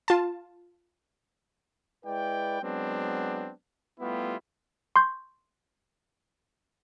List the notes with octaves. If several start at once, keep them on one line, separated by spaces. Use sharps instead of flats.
F4 A5
G#3 E4 B4 D5 G5
F#3 G#3 B3 C4 D4
G3 A3 B3 E4 F4 G4
C6 C#6 G6